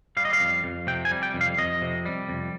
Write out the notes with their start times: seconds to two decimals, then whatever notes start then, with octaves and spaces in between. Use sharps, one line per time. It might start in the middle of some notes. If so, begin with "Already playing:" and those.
0.17 G3 F5
0.25 D#5
0.33 F5
0.40 F2
0.64 F2
0.87 C3 G5
1.05 G#5
1.11 G3
1.23 G5
1.34 F2
1.41 F5
1.58 F2 D#5
1.82 C3
2.06 G3
2.29 F2